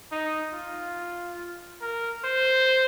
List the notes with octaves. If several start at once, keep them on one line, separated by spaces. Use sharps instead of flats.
D#4
F4
A#4
C5